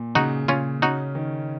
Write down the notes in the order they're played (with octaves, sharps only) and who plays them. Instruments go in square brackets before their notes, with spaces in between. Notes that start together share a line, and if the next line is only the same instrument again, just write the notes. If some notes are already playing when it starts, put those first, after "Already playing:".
Already playing: [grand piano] A#2
[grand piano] C#3 [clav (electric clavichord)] D#4 F#4
[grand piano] C#3 [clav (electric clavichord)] C#4 F4
[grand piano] C#4 [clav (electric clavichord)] D#4 F#4
[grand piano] D#3